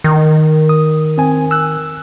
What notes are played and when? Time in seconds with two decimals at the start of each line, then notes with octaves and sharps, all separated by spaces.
0.04 D#3
0.69 D#6
1.18 C4 G#5
1.51 E6 F#6